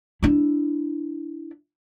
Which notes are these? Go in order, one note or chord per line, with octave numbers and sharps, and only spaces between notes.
D4 E4